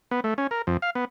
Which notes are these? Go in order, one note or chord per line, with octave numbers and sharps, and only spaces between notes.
B3
A3
C#4
A#4
F2
F5
B3